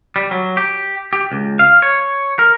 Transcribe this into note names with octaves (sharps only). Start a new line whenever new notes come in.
G3
F#3
G4
G4
C#2
F5
C#5
A#4